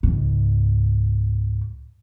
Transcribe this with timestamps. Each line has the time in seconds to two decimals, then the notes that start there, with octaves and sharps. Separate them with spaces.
0.03 C#2 G#2